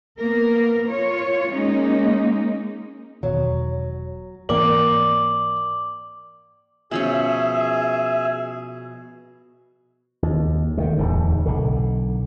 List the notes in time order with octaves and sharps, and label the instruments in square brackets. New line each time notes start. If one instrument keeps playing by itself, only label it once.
[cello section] A#3 B3 A#4
F4 C#5
G#3 A#3 C#4 D#4
[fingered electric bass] E1 B2 D#3 [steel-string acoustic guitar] F#3
[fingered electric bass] G#2 E3 C4 [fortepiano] A#3 [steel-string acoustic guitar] D5 G5 [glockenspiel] D6 F#7
[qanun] B2 F3 C#4 [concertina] G#4 [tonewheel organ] E5
[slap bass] D#2
D3 D#3 G#3
D1 E2 G#2
B1 D3